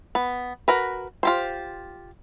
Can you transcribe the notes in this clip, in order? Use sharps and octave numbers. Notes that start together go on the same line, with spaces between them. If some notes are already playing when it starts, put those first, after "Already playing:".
B3
F#4 A#4 B4
F4 G4 C5